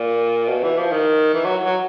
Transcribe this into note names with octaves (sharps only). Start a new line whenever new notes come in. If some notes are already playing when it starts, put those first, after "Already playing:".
Already playing: A#2
B2
E3
F3
D#3
E3
F#3
F#3